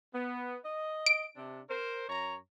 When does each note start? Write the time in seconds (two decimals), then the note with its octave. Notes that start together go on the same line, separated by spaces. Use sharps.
0.15 B3
0.64 D#5
1.06 D7
1.36 C3 D4
1.70 A#4 C5
2.09 F#2 C#5 A#5